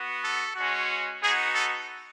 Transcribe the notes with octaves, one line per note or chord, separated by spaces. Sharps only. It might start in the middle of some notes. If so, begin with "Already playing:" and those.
Already playing: B3 F#4
A4
G#3 C#4 F#4
B3 D#4 F#4 G#4
A4